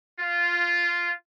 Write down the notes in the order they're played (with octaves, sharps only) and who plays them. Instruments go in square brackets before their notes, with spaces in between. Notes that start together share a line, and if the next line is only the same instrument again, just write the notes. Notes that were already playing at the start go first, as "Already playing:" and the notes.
[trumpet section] F4